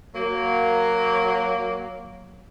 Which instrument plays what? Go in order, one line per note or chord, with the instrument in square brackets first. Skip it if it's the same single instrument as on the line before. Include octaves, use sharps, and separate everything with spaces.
[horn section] F#3 A#3